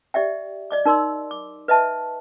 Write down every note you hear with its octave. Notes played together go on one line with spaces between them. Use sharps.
G4 D5 E5 G5
D5 D#5 D6
D#4 A#4 D5 C6 E6
D6
B4 D#5 E5 A5